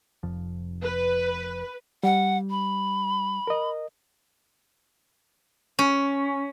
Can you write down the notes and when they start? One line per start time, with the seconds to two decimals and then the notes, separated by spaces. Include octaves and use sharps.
0.23 F1 F2 F3
0.83 B4
2.03 G3 F#5
2.50 B5
3.47 A#4 D#5
5.79 C#4